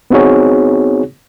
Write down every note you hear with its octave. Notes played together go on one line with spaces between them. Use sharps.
B3 C4 D#4 F#4 G#4 C#5